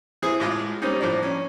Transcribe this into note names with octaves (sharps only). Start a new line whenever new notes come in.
E3 C4 E4 G#4
A2 G#3 F4 D6
G3 A#3 C4 C#4 D#4
A2 F3 A#3 D4
C#4